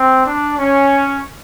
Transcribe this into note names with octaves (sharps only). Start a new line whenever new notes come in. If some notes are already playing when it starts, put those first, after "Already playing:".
Already playing: C4
D4
C#4